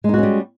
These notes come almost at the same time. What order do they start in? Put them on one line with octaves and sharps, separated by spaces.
G#3 D#4 F#4 C#4 G3